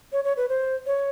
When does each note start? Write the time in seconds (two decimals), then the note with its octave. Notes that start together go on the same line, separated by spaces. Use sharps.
0.12 C#5
0.24 C#5
0.37 B4
0.49 C5
0.86 C#5